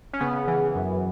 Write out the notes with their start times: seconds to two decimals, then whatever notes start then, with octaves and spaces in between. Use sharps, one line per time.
0.13 C#4
0.21 C#3 B3
0.48 E3
0.75 F#2